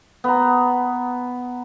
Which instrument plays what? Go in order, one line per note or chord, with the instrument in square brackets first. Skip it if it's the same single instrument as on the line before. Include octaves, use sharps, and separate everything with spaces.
[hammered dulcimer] B3 A#5